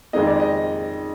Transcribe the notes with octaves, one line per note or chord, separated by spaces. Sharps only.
F2 D#3 G#3 C4 D#4 D#5
D5
D#5